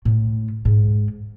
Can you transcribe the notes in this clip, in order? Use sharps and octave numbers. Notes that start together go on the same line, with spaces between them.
A2
G#2